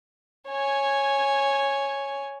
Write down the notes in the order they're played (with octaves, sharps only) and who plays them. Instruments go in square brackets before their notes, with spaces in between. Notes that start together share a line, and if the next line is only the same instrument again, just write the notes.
[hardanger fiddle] C#5 G#5